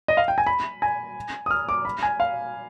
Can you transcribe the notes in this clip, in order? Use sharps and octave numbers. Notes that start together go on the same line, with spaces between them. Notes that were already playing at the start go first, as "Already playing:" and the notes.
D#5
F5
G5
G#5
B5
G#5
D#6
F6
D6
B5
G#5
F5